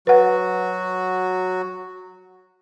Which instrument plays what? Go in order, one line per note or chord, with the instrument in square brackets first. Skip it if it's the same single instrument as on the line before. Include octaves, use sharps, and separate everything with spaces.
[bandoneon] F#3 F#4 [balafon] B4 F#5